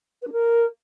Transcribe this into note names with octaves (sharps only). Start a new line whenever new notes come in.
B4
D4
A#4